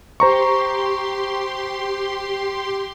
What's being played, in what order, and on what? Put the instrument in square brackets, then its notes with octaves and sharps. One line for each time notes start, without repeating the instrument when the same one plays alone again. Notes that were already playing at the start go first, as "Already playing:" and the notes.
[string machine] G4 C6 [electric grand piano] C5 A#5 C#6